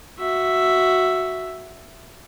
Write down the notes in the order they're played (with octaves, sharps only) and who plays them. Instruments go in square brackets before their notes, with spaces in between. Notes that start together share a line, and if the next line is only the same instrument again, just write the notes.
[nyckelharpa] F#4 E5